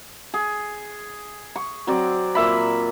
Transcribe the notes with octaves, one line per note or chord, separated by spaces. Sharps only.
G#4
C#6
F#3 C4 D5
A#2 E5 B5